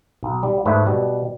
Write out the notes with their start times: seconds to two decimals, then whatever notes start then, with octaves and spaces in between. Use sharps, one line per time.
0.23 B1
0.43 G3
0.66 G#2 A3 B4
0.86 B2 G3